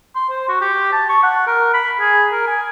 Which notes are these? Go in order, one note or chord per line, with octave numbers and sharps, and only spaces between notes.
C6
C5
F#4
G4
A5
C#6
F#5
A#4
B5
G#4
A#4
G#5